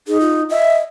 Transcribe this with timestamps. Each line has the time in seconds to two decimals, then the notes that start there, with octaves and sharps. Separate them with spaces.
0.07 D#4 G#4
0.20 F4
0.50 D#5 E5